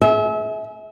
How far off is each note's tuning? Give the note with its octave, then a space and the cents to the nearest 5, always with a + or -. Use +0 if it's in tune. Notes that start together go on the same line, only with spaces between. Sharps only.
G#4 +30 E5 -30